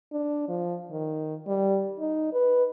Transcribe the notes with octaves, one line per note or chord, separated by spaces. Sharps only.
D4
F3
D#3
G3
D#4
B4